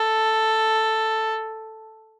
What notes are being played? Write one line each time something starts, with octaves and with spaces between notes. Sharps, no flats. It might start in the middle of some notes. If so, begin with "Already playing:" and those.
Already playing: A4